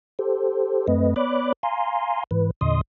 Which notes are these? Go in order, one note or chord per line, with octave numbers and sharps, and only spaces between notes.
G4 A4 C5
F#2 A3 C4 B4 D#5
B3 C#5 D5 B5 D6 F#6
F5 G#5 A#5 C6
G#2 E3 B4
E2 A#2 D3 D#5 C6 D#6